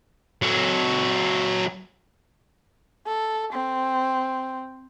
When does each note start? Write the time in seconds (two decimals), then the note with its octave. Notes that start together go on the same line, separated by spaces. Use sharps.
0.42 F#3 A4
3.06 A4
3.53 C4